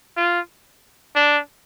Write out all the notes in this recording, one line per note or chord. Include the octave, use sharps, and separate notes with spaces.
F4
D4